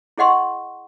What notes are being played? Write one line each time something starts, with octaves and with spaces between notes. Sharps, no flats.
E4 G#4 D#5 F#5 C6 C#6